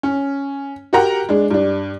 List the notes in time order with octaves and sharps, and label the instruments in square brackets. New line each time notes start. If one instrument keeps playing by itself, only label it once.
[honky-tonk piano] C#4
F#4 G4 A#4 F#5 G5 A#5
G#3 D4
G2 D4